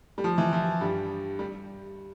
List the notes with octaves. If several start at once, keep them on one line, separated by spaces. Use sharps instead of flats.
G3
F3
E3
F3
G2 G3
G3